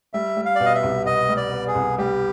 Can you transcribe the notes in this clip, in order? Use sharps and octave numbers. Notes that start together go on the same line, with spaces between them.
G3 E5
G3
F5
B2 D5
D#5
E5
C2
B2 D#5
G3
D5
B3
G#4
C2
G3 G4